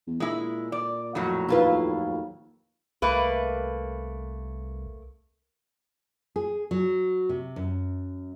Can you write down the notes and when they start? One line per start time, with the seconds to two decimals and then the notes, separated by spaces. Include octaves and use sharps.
0.07 E2
0.20 A#2 G#3 E4
0.72 D5
1.15 F2 A2 F#3
1.49 D#2 E4 F4 B4
3.02 C2 A3 A#3 B4
6.36 G#4
6.71 F#3
7.29 C3
7.56 F#2